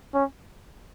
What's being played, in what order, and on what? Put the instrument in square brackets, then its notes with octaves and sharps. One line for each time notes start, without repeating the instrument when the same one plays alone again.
[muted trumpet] C#4